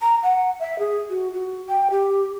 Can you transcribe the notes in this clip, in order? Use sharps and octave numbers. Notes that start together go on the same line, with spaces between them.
A#5
F#5
E5
G#4
F#4
F#4
G5
G4